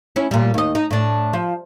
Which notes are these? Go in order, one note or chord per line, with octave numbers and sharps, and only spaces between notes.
C#4 E4
A#2 G3
D#2 D#5
D#4
A2 D4
F3